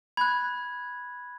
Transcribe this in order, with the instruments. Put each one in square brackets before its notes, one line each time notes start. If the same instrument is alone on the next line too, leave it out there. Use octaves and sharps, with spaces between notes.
[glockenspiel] B5 F#6 G#6